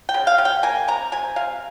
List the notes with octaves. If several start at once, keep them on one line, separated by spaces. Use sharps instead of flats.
G5
C#3
F5
C#3
G5
A#3 G#5
C3 A#5
C3 G#5
C3 F5